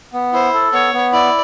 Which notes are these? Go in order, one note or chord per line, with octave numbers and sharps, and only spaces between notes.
B3
E4 C5
A4
B3 C#5
B3
E4 D5